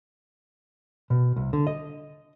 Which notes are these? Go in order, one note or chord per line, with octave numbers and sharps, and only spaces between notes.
B2
C2
D3
D#5